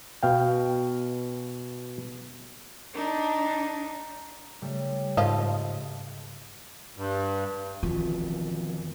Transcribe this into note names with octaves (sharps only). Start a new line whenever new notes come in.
B2 F5 G5
D4 D#4
C#3 G3 A3
G#2 F3 D#5 F5
G2
F2 B2 D#3 E3 G#3 F4